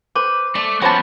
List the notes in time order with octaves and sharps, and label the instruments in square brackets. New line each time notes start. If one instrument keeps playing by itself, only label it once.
[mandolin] B4 [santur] C5 [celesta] D6
[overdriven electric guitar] A3 [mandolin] D5
[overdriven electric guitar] F3 B3 [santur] C#4 B4 C5 [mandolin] F#4 A5